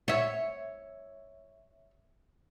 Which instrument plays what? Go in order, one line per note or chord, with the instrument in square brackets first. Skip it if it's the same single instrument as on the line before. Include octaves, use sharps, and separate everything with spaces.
[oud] C#5 E5